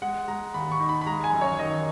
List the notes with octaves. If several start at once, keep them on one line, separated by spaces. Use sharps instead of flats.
G#3 F#5
G#3 A#5
D#2 B5
C#6
D#4
B5
B5
G#3 A#5
G#5
F#2
C#5
D#3 D#5